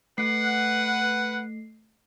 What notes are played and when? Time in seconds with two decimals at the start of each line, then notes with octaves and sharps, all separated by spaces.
0.18 A3 B4 F#5 C7